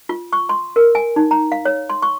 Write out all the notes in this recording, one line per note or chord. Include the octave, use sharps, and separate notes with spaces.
F4
C#6
C6
A#4
G#5
D#4
A#5
F5
C#5
C6
C#6